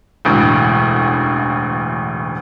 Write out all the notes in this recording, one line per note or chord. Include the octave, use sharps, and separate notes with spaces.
E1 A1 D2